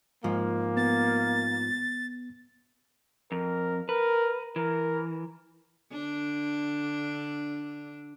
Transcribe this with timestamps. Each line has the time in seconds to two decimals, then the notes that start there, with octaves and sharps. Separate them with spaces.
0.24 G#2 F3 A#3
0.77 B3 A6
3.32 F2 A#4
3.89 A#4 B4
4.56 E3 A#4
5.92 D3 D4